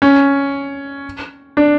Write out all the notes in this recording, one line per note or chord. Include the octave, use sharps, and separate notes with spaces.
C#4
D4